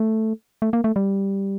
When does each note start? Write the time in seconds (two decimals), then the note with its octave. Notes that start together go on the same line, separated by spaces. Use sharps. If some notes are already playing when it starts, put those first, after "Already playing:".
Already playing: A3
0.62 A3
0.73 A#3
0.84 A3
0.96 G3